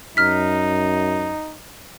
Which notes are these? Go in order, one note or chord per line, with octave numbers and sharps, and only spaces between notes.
F#2 D#4 F6 B6